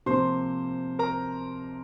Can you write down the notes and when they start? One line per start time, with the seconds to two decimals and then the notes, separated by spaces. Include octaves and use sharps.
0.06 C3 F3 A#3 C5 C6
0.99 A#4 A#5